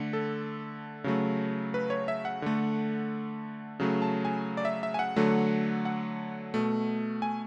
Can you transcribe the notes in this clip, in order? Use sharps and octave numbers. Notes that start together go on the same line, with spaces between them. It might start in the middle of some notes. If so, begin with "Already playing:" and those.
Already playing: D3 A3
A4
C#3 F#3 A3
B4
C#5
E5
F#5
D3 A3
C#3 F#3 A3
A5
G#5
D5
E5
E5
G#5
F#5
D3 F#3 A3
F#5
B2 A3
G#5